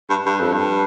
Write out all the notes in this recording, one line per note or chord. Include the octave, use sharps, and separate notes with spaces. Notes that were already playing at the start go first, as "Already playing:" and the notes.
G2
G2
F2
G2